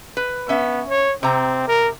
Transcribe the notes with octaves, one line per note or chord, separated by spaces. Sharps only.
B4
B3 C#4 E5
C#5
C3 C4 A#5
A#4